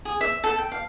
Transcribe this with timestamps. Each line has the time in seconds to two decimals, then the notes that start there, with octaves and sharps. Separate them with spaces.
0.05 G#4
0.21 E5
0.44 A4
0.58 G5
0.72 F5